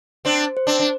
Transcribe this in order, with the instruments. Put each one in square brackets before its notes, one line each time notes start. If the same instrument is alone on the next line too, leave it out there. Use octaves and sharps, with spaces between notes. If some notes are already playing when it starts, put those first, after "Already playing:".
[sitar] C4 D4 [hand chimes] C5
[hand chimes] C5
[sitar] C4 D4
D4